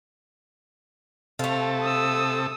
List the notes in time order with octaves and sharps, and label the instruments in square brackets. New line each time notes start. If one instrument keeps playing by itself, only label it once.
[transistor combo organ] C3 A4 [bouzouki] A3 F5
[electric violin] D#6 E6